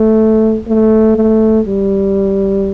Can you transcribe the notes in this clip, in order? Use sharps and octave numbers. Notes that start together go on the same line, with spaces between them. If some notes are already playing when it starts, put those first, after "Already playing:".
Already playing: A3
A3
A3
G3